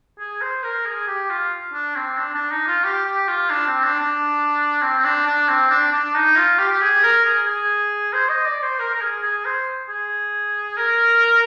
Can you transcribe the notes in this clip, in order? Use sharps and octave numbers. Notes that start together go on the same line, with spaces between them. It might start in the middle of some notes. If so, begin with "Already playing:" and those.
G#4
C5
A#4
G#4
G4
F4
D4
C4
D4
D4
D#4
F4
G4
G4
F4
D4
C4
D4
D4
C4
C4
D4
D4
C4
D4
D4
D#4
F4
G4
G4
G#4
A#4
G#4
G#4
C5
D#5
D5
C5
A#4
A#4
G#4
G#4
C5
G#4
A#4